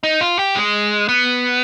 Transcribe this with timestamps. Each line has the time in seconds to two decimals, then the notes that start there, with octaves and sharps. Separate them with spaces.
0.03 D#4
0.21 F4
0.39 G4
0.56 G#3
1.09 B3